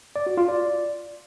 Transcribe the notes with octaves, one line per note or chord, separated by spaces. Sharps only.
D5
F#4
F4
D5